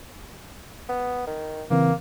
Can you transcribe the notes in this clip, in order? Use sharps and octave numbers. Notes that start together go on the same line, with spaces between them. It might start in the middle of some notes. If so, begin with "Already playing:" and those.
B3
D#3
C#3 E3 A#3 C4